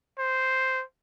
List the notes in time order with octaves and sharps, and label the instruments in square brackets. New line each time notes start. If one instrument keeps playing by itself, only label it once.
[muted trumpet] C5